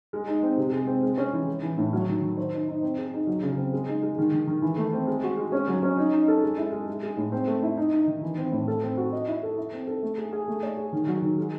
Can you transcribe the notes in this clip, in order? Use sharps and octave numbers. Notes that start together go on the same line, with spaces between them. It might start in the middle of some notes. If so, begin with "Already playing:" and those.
G#3
D#4
C4
C3
G#3
C4
G#3
C#4
E3
G#3
E3
A2
F#3
D#3
D#3
C5
D#4
D#4
C4
G#4
D#4
F#3
C#3
C4
G#3
D#4
G#3
D#3
D#3
D#3
E3
A3
C4
G#3
F#4
G#3
C#4
F#3
C#4
D#4
D#4
A4
G#3
E4
G#3
G#3
G#3
A2
C4
A3
E4
D#4
D#4
D#3
E3
C4
A2
A4
C4
F#4
D#5
E4
A4
E4
C4
A4
A3
G#4
G#4
A3
C#5
G#4
D#3
F#3
D#3
G#3